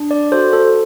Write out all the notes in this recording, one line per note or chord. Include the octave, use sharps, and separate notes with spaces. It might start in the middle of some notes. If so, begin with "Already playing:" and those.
Already playing: D4
D5
F#4 A4 C5
A4